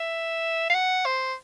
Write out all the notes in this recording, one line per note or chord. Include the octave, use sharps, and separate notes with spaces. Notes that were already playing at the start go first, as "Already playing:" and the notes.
Already playing: E5
F5
F#5
C5